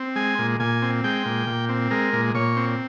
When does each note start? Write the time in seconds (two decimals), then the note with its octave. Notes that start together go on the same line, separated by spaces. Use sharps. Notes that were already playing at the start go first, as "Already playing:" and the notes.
Already playing: C4
0.16 G#3 G#5
0.38 A#2
0.60 A#2 G#5
0.82 C4
1.04 G#3 G5
1.25 A#2
1.47 A#2
1.69 C4
1.91 G#3 A#4
2.13 A#2
2.35 A#2 C#5
2.57 C4